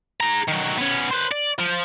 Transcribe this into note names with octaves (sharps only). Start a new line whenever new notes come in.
G#4 A#5
D#3 F#3
B3 C#4
B4 C5
D5
F3